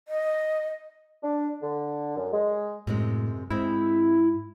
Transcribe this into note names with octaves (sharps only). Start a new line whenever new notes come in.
D#5
D4
D3
F#2
G#3
F#2 A2 C3 G#3
G#2 G#3 C4 E4